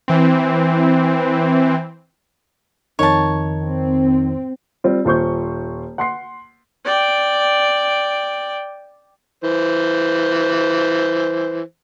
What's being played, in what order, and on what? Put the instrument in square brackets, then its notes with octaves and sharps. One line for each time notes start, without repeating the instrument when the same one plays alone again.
[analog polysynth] E3 C4
[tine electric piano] F2 D#3 D#4 [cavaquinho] C#5 A5
[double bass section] C4
[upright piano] G3 C4 F4
D#1 F4 C5 C#6 G6
F#5 C6 C7
[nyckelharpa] D5 G5
[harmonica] E3 C5